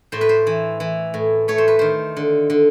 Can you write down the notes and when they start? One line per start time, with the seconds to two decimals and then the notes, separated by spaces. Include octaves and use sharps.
0.12 A2 C5
0.21 B4
0.29 C5
0.47 E3
0.80 E3
1.14 A2
1.48 A3 C#5
1.58 C5
1.68 B4
1.79 D#3 C5
2.17 D3
2.50 D3